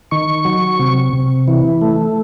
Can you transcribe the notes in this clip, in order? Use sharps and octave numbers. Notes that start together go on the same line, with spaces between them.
D#3 C#6
F#3
C3
C3
E3
A3